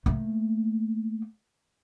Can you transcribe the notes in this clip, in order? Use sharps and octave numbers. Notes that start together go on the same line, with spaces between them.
A3 A#3